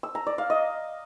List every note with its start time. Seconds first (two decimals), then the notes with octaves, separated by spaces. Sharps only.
0.03 E6
0.15 A#5
0.27 D5
0.38 F5
0.50 D#5